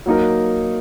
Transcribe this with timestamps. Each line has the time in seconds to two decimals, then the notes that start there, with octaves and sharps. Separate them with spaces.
0.06 F#3 A#3 D#4 A#4